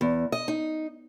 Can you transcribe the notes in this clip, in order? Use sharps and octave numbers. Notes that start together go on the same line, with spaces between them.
E2
D#5
D#4